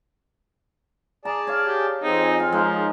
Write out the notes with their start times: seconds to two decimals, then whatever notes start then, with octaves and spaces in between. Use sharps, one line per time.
1.25 G#4 D5 A5 A#5
1.47 C#5 F5
1.66 G4
2.03 F2 C4 D#4 G#4
2.40 F4
2.52 F3 G#3 D#4 A#4